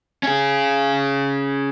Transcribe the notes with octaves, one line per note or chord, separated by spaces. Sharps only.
C#4 G#4